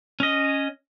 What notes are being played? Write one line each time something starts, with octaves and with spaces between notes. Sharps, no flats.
C#4 D#5